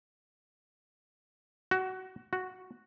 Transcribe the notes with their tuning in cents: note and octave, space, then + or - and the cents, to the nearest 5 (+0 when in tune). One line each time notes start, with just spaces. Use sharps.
F#4 +20
F#4 +0